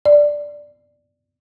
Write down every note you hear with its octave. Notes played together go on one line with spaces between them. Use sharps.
D5